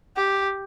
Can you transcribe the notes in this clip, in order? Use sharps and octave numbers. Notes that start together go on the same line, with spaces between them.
G4